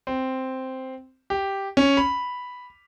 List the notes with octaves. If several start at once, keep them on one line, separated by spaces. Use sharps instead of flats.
C4
G4
C#4
B5